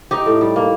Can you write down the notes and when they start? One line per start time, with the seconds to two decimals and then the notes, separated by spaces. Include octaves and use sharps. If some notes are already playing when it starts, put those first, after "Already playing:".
0.11 D#4 G4
0.26 A2
0.41 G3
0.56 A#3